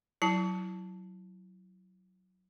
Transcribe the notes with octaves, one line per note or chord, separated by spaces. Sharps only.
F#3 E4 A5